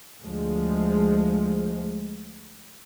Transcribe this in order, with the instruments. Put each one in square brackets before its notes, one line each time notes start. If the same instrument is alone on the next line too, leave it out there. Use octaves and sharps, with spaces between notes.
[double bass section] D2 F3 G#3